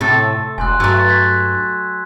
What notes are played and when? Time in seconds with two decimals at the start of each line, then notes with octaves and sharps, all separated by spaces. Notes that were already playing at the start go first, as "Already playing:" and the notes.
0.01 A2 C3 A3 A4
0.58 E1 G#5 C6 F#6
0.80 G2 F#3 A3 E6
1.08 F#6 G#6 B6